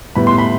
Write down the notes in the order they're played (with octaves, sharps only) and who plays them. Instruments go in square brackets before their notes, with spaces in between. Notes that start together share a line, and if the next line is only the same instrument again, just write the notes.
[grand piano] A2 G3 B3 B5
C6
B5